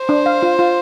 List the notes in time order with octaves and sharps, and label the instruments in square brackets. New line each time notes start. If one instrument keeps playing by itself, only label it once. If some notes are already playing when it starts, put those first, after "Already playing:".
Already playing: [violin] C5
[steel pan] D4
F5
F4
F4